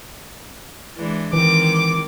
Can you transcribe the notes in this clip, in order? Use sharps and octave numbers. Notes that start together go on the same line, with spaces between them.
E3 G#3 D4
D#3 E3 G#3 C4 D6